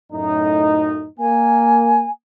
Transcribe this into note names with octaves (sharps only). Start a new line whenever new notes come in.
F#2 A2 D#4
A#3 G#5